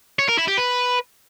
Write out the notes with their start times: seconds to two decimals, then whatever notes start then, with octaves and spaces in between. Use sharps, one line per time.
0.19 C#5
0.29 A#4
0.38 E4
0.48 G4
0.58 B4